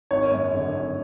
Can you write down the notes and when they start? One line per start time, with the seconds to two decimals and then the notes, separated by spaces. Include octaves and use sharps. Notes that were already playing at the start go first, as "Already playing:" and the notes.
0.11 G#1 C#5
0.32 F#2
0.54 D3
0.76 G#1